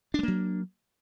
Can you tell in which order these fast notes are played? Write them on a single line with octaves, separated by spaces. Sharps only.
D4 G#3 A#3 F#3